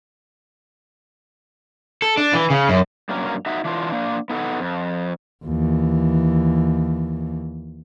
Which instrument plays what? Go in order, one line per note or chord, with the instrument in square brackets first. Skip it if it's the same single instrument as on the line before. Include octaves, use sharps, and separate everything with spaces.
[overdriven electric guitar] A4
D4
E3
C#3
F#2
[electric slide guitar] G2 F#3 A#3 C#4 A#4
D#4 F#4 E5
E3 D4 F4
A#3 D4
B3 D#4 A4 F#5
F2
[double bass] D#2 E3